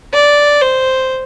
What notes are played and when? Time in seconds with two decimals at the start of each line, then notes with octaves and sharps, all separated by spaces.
0.14 D5
0.62 C5